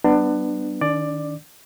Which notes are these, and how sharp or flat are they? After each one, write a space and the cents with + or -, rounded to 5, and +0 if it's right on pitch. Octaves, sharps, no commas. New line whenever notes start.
G3 -30 B3 +15 D4 +25
D#3 +0 D4 -40 D5 +10